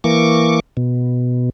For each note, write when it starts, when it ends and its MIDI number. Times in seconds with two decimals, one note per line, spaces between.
0.04 0.60 52
0.04 0.60 58
0.04 0.60 85
0.04 0.60 86
0.77 1.50 47